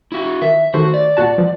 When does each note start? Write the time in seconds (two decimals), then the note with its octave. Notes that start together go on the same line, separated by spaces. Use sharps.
0.12 E4 F#4
0.42 D#3 E5
0.74 D#3 A3 F#4 C5
0.94 D5
1.17 A#2 F#4 A5
1.38 F3